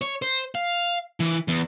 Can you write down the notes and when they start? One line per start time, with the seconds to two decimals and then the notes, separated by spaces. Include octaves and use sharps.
0.02 C#5
0.22 C5
0.55 F5
1.20 E3
1.48 E2